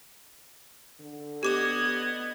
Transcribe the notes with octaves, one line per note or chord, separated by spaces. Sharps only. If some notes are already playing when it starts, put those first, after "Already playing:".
D3
B3 G4 D#5 D6 G#6 E7